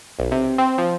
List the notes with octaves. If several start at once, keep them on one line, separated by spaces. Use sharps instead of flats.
B1
C3
C4
F3